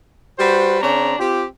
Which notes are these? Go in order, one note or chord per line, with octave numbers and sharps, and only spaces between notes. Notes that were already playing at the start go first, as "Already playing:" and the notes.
G3 F#4 B4 C5
C#3 C4 D4 C#5 A#5
C4 F4 G4